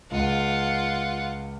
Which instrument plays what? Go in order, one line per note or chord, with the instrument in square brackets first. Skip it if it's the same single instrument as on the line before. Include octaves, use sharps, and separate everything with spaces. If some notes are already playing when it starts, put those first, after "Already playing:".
[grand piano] C#2 [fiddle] F4 F#5